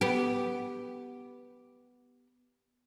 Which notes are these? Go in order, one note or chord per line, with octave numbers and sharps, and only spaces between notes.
B3 G4